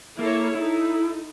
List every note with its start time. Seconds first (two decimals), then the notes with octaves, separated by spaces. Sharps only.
0.19 A#3 E4 A4 C#5
0.55 D#4 E4 A4